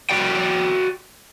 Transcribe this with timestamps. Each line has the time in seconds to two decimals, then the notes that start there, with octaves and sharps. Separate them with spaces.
0.10 F#4 D5 G5